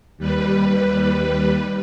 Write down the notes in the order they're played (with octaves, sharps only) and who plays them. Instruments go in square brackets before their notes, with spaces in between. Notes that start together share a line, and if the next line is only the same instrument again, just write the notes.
[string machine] D#2 G3 B4